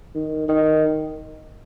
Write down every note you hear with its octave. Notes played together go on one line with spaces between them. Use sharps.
D#3
D#3